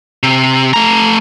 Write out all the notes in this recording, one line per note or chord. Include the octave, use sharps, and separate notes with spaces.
C3
A3 A#5